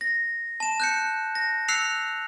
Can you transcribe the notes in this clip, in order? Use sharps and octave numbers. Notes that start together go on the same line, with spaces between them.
A#6
A5 E7
F#6 G6 C#7
A#6
E6 F#6 C7 C#7 F7